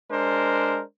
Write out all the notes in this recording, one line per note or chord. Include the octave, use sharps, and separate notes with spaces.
G#3 D4 A#4 C5